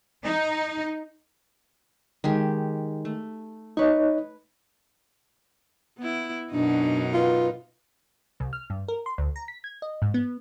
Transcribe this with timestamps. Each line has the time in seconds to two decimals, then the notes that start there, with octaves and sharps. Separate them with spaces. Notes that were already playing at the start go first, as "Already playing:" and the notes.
0.24 D#4
2.24 D#3 G#3 G4
3.05 A3
3.77 D#4 B4 C#5 D#5 C#6
5.98 B3 E4
6.52 F#2 B2 D4 D#4
7.14 F4 B4
8.40 C2
8.53 F6
8.70 G2
8.88 A#4
9.06 C6
9.18 D2
9.36 A#5
9.48 B6
9.64 G#6
9.82 D#5
10.02 G#2
10.14 B3